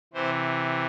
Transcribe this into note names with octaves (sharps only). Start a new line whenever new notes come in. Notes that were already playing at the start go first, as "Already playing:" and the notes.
C3 E3 C5